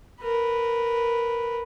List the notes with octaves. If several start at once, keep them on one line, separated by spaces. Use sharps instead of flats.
A#4 B4